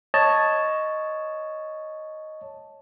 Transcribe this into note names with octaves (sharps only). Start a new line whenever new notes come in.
C#5 D#5 A5